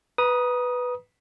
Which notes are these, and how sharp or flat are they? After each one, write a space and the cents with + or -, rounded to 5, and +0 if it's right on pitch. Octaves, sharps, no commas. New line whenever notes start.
B4 +0 A#5 +45 D#6 +0